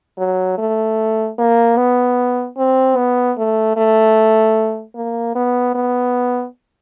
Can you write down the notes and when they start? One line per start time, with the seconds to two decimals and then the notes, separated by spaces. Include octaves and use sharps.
0.18 F#3
0.58 A3
1.38 A#3
1.77 B3
2.57 C4
2.96 B3
3.37 A3
3.77 A3
4.95 A#3
5.35 B3
5.75 B3